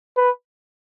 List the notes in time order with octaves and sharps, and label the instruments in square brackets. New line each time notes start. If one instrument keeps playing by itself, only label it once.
[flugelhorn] B4